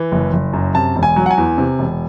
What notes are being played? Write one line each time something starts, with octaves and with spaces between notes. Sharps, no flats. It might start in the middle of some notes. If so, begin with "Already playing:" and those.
Already playing: E3
F#1
F#1
F#2
C3 A5
E1
G#5
F#3
F#5
G#5
E2
C3
E1